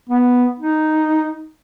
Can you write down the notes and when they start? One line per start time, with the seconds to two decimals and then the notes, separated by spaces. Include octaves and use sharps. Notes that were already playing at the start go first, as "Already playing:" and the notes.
0.09 B3
0.59 D#4